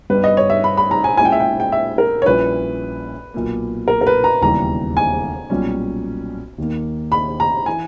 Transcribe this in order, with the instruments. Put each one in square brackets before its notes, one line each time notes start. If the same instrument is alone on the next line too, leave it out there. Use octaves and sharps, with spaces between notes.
[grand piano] G2 G3 B3 D#4 [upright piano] B4
[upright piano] D#5
C#5
E5
B5
B5
A#5
G#5
[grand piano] A#2 G#3 C#4 E4 [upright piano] G#5
[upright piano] G5
E5
G5
G5
E5
A#4
C#5
[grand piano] A#1 A#2 G3 C#4 E4 [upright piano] B4
[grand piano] B1 A#2 A#3
[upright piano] A#4
A#4
B4
A#5
[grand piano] E1 D#2 C#3 E3 G3 [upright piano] A#5
[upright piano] G#5
[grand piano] B1 A#2 G3 C#4
D#2 D#3 A#3
[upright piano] B5
A#5
[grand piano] E3 [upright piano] G#5